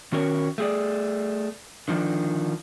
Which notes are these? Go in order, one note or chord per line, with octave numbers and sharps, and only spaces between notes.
D#3 C#4 F#4 A#4 C#5
A3 G#4 D5
D3 D#3 F3 D4